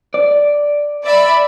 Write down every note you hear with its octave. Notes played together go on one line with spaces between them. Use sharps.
D5
D5 E5 B5